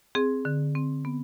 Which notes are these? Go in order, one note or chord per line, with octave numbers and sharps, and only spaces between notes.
C4 G#4
D3
C4
B3